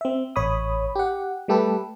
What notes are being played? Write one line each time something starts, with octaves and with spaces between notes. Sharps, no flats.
C4 E5
A1 C#5 B5 D#6
G4 F#5
G3 A3 G4 A4 B4